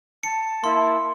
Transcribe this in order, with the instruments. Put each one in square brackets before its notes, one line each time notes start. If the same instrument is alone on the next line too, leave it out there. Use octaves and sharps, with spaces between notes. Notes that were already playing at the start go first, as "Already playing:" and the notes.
[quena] A5 [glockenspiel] C#7
[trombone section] A#3 E4 [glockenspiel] C6